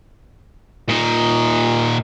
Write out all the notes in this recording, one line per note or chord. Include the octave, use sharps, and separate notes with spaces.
A#2 D#4